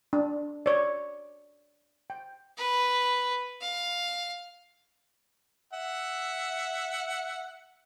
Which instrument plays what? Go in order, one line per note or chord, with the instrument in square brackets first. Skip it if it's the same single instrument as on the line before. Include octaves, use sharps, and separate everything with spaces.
[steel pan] D4
C#5 D5
G5
[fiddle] B4
F5
[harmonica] E5 F#5